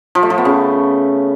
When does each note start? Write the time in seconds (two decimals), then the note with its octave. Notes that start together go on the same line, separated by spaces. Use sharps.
0.15 F3
0.23 A3
0.30 F3
0.38 B3
0.45 C#3